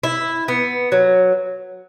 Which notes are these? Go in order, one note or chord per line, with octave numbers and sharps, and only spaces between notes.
E4
B3
F#3